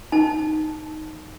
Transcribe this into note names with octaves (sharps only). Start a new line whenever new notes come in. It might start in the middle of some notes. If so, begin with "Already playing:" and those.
D#4 A5